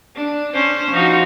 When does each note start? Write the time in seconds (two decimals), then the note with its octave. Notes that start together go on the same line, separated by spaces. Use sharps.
0.15 D4
0.53 C#4 D4 C5
0.91 F3 D#4 F#4